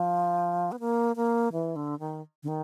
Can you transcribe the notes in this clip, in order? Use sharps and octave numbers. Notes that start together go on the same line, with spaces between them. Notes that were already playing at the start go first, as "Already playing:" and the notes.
Already playing: F3
B3
A#3
A#3
E3
D3
D#3
D3
D#3